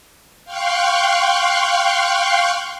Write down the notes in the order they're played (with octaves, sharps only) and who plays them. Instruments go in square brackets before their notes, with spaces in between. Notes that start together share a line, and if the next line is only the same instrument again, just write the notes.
[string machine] F5 G5 C6 C#6 F#6